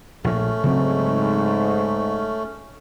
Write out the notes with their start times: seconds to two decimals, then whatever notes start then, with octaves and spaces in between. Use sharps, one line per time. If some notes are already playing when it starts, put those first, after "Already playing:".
0.24 A#1 A#2 A3 C#4
0.64 G#2 C#3 F#3 C4